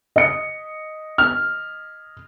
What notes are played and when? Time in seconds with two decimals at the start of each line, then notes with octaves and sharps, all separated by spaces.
0.16 D#5 C#7
1.18 F6